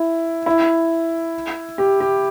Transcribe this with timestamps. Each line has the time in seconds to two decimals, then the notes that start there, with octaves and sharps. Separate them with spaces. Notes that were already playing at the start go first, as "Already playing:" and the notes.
Already playing: E4
0.46 E4
1.78 G4
2.00 G4